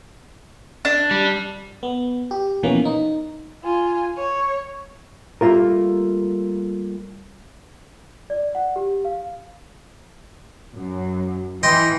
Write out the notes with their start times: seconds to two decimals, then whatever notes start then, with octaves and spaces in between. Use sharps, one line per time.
0.85 D4
1.11 G3
1.83 B3
2.31 G4
2.63 B2 E3 F3 A#3 B3 C#4
2.85 D#4
3.63 F4 G#5
4.16 C#5
5.41 G3 A3 A#3 F4 A#4
8.30 D5
8.55 F#5
8.76 G4
9.05 F5
10.74 F#2
11.63 E3 D#5 G5 C6